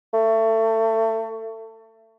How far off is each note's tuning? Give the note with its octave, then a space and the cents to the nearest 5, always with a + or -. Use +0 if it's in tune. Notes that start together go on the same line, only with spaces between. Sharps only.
A3 +25